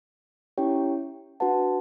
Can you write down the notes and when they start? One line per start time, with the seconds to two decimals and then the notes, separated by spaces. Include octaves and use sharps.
0.58 C#4 E4 G4 C#5 G5
1.40 D4 F#4 B4 F#5 A5